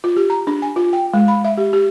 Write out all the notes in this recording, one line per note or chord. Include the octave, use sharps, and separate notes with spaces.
F4
G4
A#5
D4
G#5
F4
G5
G#3
B5
E5
G4
G4